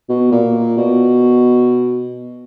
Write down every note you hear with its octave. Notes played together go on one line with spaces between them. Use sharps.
B2
A#2
B2